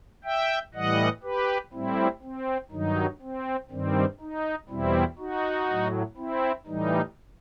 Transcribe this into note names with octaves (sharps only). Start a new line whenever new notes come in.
E5 G5
A2 E3 G3 D#5 F#5
G4 B4
A2 G3 C4 E4
C4
G2 D#3 F#3 D#4
C4
G2 D#3 G3 C4
D#4
E2 B2 G3 C4 E4
D#4 F#4
A2 F#3
C4 E4
A2 E3 G3 D#4